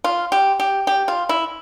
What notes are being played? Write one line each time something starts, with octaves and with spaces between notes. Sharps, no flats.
F4
G4
G4
G4
F4
E4